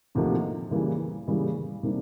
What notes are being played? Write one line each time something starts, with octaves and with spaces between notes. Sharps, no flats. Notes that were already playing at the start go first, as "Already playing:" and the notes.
D2 C3 F3 A#3 D#4
C#3 E3 G3 A#3
C#3 E3 G3 A#3
C3 D#3 G3 A#3 D4